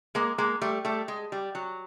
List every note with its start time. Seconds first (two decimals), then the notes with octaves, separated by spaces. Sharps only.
0.15 G#3 A#3
0.38 G#3 A#3
0.61 G3 A3
0.85 G3 A3
1.08 G#3
1.32 G3
1.55 F#3